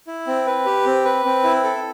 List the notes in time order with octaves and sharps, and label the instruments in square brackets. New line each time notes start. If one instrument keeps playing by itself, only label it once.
[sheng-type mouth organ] E4
C4
B4
G4
C4
B4
C4
E4
A4